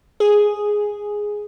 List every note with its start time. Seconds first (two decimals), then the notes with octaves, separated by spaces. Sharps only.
0.20 G#4